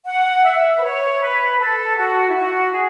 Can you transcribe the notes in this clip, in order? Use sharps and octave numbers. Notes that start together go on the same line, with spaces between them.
F#5
E5
B4
C#5
B4
A4
F#4
E4
F#4
G#4